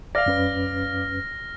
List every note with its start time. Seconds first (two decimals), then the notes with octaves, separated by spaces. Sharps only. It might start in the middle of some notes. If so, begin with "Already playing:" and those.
0.15 D5 F5 F6 A#6
0.26 F#2 C#4 B4